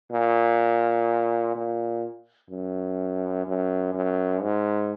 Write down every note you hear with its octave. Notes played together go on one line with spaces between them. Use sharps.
A#2
A#2
F#2
F#2
F#2
G#2